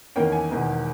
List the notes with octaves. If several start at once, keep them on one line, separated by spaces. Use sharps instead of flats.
E2 D#3 A#3 C#4 G5
G#5
E1 E2 D#3 A#3